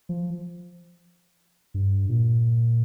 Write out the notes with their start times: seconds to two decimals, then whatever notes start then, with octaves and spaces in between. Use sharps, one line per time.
0.09 F3
1.74 G2
2.09 A#2